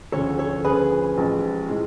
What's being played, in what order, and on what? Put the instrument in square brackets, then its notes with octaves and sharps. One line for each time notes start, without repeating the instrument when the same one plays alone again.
[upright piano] D2 C#3 F3 [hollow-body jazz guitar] A4 C#5
[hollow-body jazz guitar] A4 C#5
[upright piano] D2 C#3 F3 [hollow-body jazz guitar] G#4 B4
[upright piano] A1 A2 F3 G#3
A2 F3 G#3